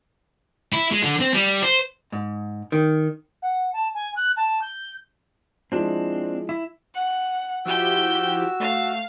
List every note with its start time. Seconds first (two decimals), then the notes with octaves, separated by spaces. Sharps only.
0.73 E4
0.91 G#3
1.03 D3
1.20 C4
1.34 G3
1.63 C5
2.12 G#2
2.72 D#3
3.42 F#5
3.73 A5
3.94 G#5
4.16 F#6
4.37 A5
4.61 G6
5.72 F3 G#3 C4 D4 E4
6.49 E4
6.94 F#5
7.66 F3 E4 F#4 G4 G5 E6 G6
8.60 A3 F5